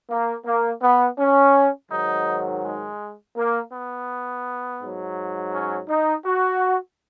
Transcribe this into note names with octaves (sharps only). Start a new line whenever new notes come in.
A#3
A#3
B3
C#4
G#2 D#3 F#3 D#4
G#3
A#3
B3
G#2 F#3
C#4
D#4
F#4